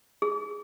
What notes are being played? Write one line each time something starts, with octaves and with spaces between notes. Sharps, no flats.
G#4